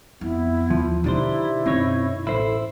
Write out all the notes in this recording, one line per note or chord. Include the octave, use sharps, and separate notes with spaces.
F2 B3 E4
D#2 F3
B2 D3 D#3 D4 E4 G4 C5
F#2 B2 D#3 C4 D#4 C#5
A1 E4 A4 C5